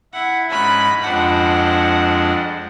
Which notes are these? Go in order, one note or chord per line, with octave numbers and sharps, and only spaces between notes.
E4 F#5
G#2 C#4 B5 F#6
F2 G#3 D4 C5 F#5